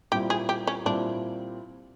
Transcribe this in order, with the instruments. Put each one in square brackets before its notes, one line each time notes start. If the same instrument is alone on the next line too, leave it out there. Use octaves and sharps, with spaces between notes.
[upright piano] A#2 G3 C4 E4 [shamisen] G4
[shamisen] G#4
G4
C#4
[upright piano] A#2 G3 C4 E4 [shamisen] D4